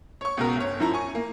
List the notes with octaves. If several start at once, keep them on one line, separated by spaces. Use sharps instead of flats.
C#5 C#6
C#2 B2 A#4
G1 C#5
F#2 F3 E4 A#5
G#5 C#6
A#3